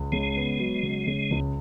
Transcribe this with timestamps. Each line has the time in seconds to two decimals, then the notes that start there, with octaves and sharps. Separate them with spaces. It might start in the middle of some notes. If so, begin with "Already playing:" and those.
Already playing: C#2
0.12 C#3 G#3
0.36 B3
0.59 F#3
0.83 C#3
1.07 C#3
1.31 C#2